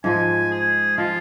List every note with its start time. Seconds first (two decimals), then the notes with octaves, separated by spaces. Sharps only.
0.04 G#2 F3 G#3 G#5
0.51 G#4
0.98 F3 G#3 F4